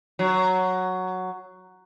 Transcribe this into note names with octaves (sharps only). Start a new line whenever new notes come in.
F#3